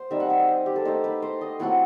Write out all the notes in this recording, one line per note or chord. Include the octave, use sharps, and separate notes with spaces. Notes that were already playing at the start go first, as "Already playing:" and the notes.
Already playing: C5
G3 C4 D#4 E5
F#5
E5
D#5
C5
G4
A4
A3 D#4 C5
B4
C5
D#5
F#3 A3 C4 E4 F#5